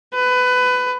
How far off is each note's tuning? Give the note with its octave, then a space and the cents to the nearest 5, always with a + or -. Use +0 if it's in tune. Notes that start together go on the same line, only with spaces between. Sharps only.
B4 +20